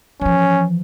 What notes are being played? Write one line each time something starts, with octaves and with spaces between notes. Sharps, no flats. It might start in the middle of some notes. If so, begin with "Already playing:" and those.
E3 F3 C#4